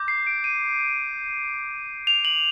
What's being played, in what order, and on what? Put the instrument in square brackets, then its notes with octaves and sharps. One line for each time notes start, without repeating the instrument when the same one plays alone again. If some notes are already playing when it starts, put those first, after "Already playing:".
Already playing: [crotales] D6 G6
C7
D7
D#7
F7
F#7